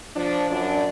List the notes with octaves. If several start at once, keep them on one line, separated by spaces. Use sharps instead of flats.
F3 D4
F#2 D4